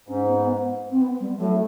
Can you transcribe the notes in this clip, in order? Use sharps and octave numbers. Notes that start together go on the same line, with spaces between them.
G#2 C#4
B3
C4
B3
G3
A2 F#3